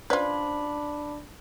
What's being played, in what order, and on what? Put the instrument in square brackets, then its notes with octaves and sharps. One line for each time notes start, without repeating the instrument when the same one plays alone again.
[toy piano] C#4 C5 D5 [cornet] D4 [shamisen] F4 B4 [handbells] B5